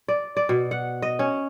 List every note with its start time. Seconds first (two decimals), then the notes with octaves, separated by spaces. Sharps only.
0.08 D5
0.37 D5
0.49 B2
0.71 F#5
1.02 D#5
1.19 C#4